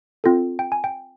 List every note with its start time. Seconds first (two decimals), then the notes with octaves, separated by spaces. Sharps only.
0.24 C4 F4 A4
0.59 G5
0.72 G#5
0.84 G5